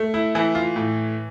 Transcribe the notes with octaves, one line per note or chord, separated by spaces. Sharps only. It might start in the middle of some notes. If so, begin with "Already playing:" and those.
Already playing: A3
E4
E3 E4
F4
A2